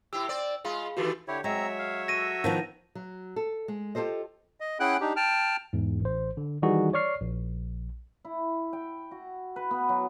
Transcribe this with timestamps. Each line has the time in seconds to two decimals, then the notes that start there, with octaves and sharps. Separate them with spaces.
0.13 C3 E4 G4 E6
0.29 C4 D5
0.65 G#3 F4 G#4 F5 B5
0.97 D#3 E3 A3 F#4 G4
1.28 D3 E4 G4 C#5
1.44 F#3 G#3 C4 C#5 E5 A#5
1.79 F5
2.08 F#4 A4 A#6 D#7
2.44 D#3 F3 B3
2.95 F#3
3.36 A4
3.68 G#3
3.95 F4 G4 A4 C5 D#5
4.60 D#5
4.80 C#4 E4 G#4 F#5 G5 F#6
5.00 D4 D#4 G4
5.16 G5 A5 F6
5.73 E2 G#2
6.01 A1 C5
6.37 D3
6.62 D#3 E3 G3 D#4 F#4 G#4
6.93 C#5 D5 C#6 F6 C7
7.21 A#1
8.25 E4
8.73 G5
9.11 F#4
9.56 B4
9.71 B3
9.89 F#3